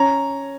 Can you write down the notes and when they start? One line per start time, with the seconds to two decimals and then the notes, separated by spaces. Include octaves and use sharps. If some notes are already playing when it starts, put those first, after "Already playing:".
Already playing: C#4 A#5